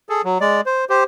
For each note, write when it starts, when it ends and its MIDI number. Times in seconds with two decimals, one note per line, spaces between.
0.09 0.22 68
0.09 0.22 69
0.25 0.38 54
0.41 0.61 56
0.41 0.61 74
0.66 0.85 72
0.90 1.04 67
0.90 1.04 72